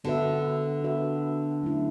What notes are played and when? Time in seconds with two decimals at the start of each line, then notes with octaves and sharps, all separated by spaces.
0.04 D3 B3 F#4 B4 E5
0.84 B3 F#4 B4 E5
1.62 F#3 A3 C#4 E4